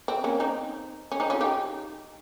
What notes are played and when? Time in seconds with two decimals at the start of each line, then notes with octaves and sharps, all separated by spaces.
0.08 C4
0.24 A#3 C#4
0.40 C4 D#4
1.12 C#4
1.20 C4 D#4
1.30 C#4 F4
1.41 D#4 G4